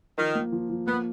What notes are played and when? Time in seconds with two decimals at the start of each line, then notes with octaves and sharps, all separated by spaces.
0.18 D#3 F3
0.35 A#3
0.52 F3
0.70 F3
0.87 A#3 B3